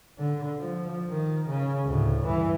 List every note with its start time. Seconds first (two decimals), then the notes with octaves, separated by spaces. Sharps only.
0.19 D3
0.59 F3
1.10 D#3
1.49 C#3
1.85 D2 A2
2.25 G2 E3